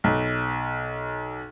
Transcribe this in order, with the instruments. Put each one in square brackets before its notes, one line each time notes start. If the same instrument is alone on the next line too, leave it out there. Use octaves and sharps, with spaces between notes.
[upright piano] B1